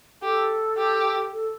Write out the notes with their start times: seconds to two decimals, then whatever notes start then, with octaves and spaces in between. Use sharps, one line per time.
0.22 G4 A4
0.78 G4
1.32 A4